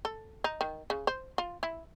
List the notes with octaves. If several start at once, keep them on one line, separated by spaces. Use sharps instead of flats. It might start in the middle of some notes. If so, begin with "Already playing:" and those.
A4
D#4
D#3
C#3
C5
F4
E4